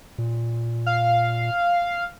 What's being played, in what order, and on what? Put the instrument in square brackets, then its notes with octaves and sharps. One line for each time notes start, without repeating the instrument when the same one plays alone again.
[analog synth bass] A#2
[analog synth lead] F5